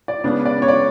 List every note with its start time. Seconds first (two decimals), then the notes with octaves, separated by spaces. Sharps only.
0.08 D5
0.24 C#3 G#3 B3 D4
0.46 D5
0.62 C#5
0.68 D5